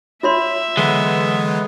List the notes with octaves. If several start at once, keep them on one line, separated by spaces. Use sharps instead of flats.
F4 C#5 E5 C6
D3 E3 F#3 G#3 B3